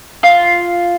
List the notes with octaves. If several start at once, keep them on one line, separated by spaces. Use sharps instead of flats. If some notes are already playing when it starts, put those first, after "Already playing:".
F4